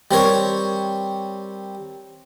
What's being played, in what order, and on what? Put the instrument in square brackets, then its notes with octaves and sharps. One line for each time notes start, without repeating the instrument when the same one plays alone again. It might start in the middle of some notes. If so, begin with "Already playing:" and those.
[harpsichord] G3 C4 A#4 C#5